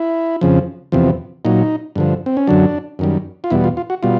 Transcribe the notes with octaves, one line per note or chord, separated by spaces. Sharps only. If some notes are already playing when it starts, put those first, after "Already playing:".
Already playing: E4
F2 C#3 F3
E2 C3 F3
A#2 F#3 D#4
G2 D3 F3
C4
C#4
F#2 D3 F#3 D4
F#2 D#3 G3
F4
E2 B2 G3 E4
F4
F4
F#4
B2 G3 F4